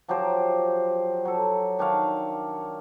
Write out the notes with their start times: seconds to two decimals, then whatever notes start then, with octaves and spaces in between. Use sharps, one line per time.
0.08 F3 F#3 G4 C5
1.25 F#3 A4
1.79 D#3 D4 C#5 F5